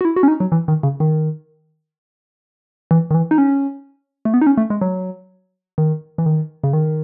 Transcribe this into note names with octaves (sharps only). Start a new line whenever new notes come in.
F#4
E4
F#4
C#4
D#4
F#3
E3
D#3
C#3
D#3
E3
D#3
E3
D#4
C#4
A3
B3
D#4
C#4
A3
G#3
F#3
D#3
E3
D#3
C#3
D#3